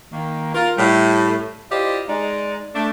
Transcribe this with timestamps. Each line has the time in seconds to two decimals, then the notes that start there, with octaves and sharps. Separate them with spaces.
0.12 D#3 A#3
0.55 F4 A#4
0.78 A2 G3
1.71 E4 F4 G4 C5 D5 D#5
2.09 G#3 D#4 D5
2.75 A3 D4